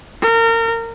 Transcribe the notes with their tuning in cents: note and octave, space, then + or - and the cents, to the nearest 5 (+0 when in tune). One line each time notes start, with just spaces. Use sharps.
A#4 -30